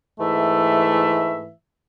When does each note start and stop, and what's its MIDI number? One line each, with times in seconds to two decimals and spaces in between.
0.19 1.51 44
0.19 1.51 52
0.19 1.51 57
0.19 1.51 76